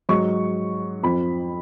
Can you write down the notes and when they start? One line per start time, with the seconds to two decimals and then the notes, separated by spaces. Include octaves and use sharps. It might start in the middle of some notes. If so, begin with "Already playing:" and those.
0.09 G#2 F#3 C#6
1.03 F2 F3 B5